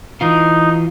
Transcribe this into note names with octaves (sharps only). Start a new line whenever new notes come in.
E3 D#4 F4